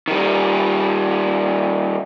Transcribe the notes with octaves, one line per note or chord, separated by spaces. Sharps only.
D#3 G3